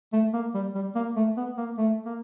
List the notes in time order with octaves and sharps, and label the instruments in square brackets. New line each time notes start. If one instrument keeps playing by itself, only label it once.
[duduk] A3
A#3
G3
G3
A#3
A3
B3
A#3
A3
A#3